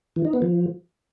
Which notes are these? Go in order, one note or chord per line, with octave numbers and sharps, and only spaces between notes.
E3
D#4
B3
F3